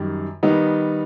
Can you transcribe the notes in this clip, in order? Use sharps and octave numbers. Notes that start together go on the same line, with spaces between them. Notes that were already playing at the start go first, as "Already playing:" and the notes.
Already playing: F#2 D#3 G3
D#3 G3 B3 D#4